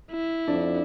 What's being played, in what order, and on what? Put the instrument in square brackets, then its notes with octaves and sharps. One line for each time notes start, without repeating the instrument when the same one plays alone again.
[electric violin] E4
[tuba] F2 [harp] D4